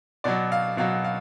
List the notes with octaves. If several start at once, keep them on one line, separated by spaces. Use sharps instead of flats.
B2 F#3 D5
F5
B2 F#3 F5
F5